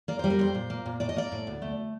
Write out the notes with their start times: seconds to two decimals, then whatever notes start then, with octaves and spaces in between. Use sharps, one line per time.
0.08 A#3 D5
0.19 G3 C5
0.30 A#4
0.39 F2 C5
0.55 A#2
0.70 A#3
0.86 A#2
1.00 A2 D5
1.09 D#5
1.16 A#3 D5
1.32 A2
1.47 D2
1.62 A3